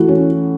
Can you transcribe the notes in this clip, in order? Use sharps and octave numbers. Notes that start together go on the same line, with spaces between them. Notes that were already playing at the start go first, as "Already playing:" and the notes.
Already playing: E3 A3 F#4
C#4